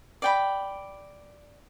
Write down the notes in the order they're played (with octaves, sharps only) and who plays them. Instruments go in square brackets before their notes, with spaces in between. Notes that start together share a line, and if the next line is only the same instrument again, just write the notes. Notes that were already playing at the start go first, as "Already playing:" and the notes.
[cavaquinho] D5 G5 B5